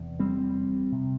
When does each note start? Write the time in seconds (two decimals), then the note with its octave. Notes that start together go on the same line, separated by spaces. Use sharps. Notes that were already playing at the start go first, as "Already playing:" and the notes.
Already playing: E2 C3
0.19 G3 C4
0.92 C3